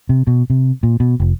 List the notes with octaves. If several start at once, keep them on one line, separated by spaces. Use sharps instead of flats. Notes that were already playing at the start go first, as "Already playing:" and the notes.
C3
B2
C3
A#2
B2
F1